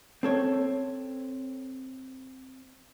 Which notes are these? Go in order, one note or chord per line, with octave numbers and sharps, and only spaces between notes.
C4 A4 C#5